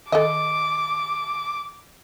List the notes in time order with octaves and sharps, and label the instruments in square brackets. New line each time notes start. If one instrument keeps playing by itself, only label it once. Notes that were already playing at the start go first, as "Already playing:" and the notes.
[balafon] D#3 [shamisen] A4 D#5 [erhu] D6